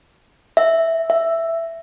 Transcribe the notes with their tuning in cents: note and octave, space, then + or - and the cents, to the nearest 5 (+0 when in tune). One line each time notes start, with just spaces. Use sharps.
E5 -5
E5 +5